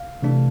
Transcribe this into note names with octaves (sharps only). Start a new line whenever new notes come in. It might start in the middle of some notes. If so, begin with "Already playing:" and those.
Already playing: F5
C3 E3 A3 D4